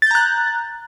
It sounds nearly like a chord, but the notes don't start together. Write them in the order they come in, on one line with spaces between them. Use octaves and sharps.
A6 G6 A#5 F#6